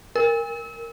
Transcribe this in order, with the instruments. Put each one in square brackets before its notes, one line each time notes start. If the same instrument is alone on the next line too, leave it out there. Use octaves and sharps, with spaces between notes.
[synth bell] A#4